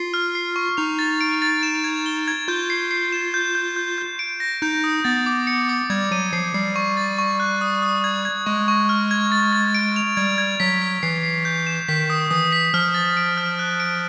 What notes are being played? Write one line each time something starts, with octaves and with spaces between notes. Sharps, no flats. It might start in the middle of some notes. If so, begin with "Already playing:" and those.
Already playing: F4 C7
F6
C7
C#6
D#4 F7
A6
D7
A6
E7
G#6
G7
G#6
F4 G6
C7
C7
E7
G6
G6
G6
G6
D7
A#6
D#4 G6
D#6
B3 A6
D6
C#7
D6
G3 G#6
F#3 D#7
F3 C7
G3 C7
C#6
A6
C#6
F#6
D#6
D#6
G#6
G#6
G#3 C#6
C#6
F6
G#6
A6
A6
D7
F7
G3 G#6
G#6
F#3 B6
B6
E3 C7
C7
G6
E7
D#3 B6
D#6
E3 D#6
B6
F3 F6
A6
D7
F6
F#6
D7